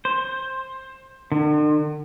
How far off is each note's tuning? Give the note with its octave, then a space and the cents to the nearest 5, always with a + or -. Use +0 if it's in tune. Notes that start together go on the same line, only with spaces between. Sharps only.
C5 +15
D3 +45